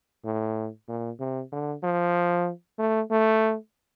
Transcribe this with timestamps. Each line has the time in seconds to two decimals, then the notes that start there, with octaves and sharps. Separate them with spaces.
0.25 A2
0.88 A#2
1.20 C3
1.52 D3
1.83 F3
2.79 A3
3.11 A3